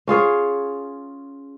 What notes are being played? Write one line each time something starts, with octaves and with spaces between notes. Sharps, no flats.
C#4 F4 G#4 C#5